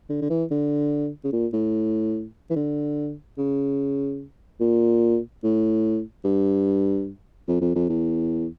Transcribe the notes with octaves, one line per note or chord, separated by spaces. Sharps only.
D3
D3
E3
D3
C#3
A#2
A2
E3
D3
C#3
A#2
A2
G2
F2
F2
F2
E2